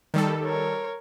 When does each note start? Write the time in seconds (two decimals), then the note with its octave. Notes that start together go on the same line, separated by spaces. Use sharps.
0.14 D#3 G3 A4
0.44 A#4 C#5